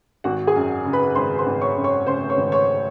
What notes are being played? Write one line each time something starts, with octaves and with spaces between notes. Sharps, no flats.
G#1 F#4 F#5
G#4 G#5
F#2
C#3
B4 B5
G#1 C5 C6
C5 C6
G#1
C#5 C#6
F#2
C#5 C#6
C#3 C5 C6
C#5 C#6
G#1
C#5 C#6